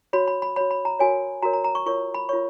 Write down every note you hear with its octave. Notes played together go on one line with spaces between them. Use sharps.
F#4 C#5 B5
B5
B5
F#4 C#5 B5
B5
A#5
F#4 A#4 C#5 G#5
F#4 A#4 C#5 A#5
A#5
A#5
C#6
F4 A#4 C#5 C#6
B5
F4 A#4 C#5 C#6